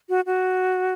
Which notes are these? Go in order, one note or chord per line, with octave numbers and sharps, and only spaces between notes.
F#4
F#4